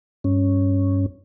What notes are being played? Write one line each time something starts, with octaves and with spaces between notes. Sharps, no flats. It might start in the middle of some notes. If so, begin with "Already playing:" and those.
G2 C#4